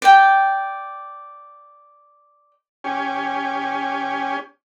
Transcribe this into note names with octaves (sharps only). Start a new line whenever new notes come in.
D5 G5
C#4 G4 G#5